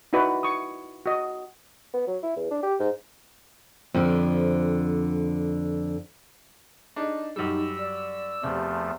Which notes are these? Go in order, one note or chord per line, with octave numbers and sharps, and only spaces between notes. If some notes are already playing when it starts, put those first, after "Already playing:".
D#4 E4 F#4 B4 D5
C#6 D#6
F#4 D#5
B3
F#3
E4
E2
D4
G4
G#2
F2 D3
D4 D#4
F#2 G3 D#4 E6
D5
E2 C3 F3 A3